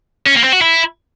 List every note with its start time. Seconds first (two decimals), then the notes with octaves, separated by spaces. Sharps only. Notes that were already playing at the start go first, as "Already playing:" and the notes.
0.27 C#4
0.35 A#3
0.44 C4
0.53 F#4
0.61 E4